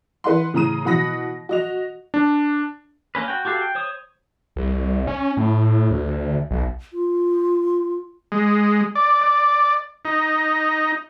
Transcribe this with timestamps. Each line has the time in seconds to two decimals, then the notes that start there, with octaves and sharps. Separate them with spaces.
0.24 E3 B4 F#5 C6
0.54 A2 C#3 E3 A#5 D#6 D#7
0.85 B2 E3 F#5 B5 D#6 A#6
1.49 F#4 D#5 F7
2.14 D4
3.15 A#3 C#4 B4
3.28 F#4 G5
3.45 F#4 G4 A4 F5
3.62 G5
3.75 C5 C#5 D#6
4.56 C2
5.07 C#4
5.37 A2
5.91 D2
6.51 B1
6.93 F4
8.32 G#3
8.95 D5
9.21 D5
10.05 D#4